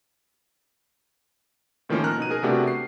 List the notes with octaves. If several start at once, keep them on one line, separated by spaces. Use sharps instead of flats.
A2 D#3 F3 A#3 C#4
A#5 F6 F#6
B2 D#4 D#7
G#4 A#4
C3 A3 B3 D4 F#4 G4
C7